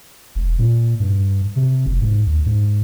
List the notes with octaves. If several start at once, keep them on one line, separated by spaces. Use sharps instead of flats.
E1
A#2
G2
C3
F#1
G#2
D#2
G#2